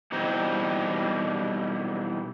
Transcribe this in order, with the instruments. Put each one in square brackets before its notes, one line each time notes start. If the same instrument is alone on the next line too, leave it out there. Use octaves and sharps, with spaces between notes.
[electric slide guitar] B2 E3 G3 C4 D#4